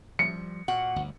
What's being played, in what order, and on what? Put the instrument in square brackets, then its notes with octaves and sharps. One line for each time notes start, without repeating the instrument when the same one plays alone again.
[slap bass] F3 G3 [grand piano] C#7
[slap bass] A#2 [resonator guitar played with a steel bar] F#4 F#5
[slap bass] G1 D2